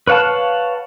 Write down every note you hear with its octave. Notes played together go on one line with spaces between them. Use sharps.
B4 C#5 F5 F#5 A5